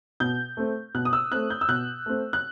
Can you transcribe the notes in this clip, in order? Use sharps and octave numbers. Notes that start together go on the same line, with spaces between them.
B2 G6
A3 C4
B2 F#6
D#6
E6
A3 C4 F#6
G6
E6
B2 F#6
A3 C4
F#6